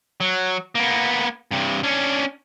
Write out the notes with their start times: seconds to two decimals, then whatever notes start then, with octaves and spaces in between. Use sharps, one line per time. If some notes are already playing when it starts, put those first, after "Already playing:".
0.20 F#3
0.75 A#3 B3
1.51 G2 C3
1.83 C#4 D4